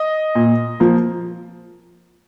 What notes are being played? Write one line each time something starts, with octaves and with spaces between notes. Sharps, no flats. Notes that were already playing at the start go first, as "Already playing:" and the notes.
Already playing: D#5
A#2
F3 A#3